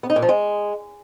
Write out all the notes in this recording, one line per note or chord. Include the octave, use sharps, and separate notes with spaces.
B3
D#4
A#2
F3
G#3